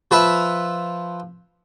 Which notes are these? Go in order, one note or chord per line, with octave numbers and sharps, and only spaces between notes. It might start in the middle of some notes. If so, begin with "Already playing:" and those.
F3 F4 B4 E5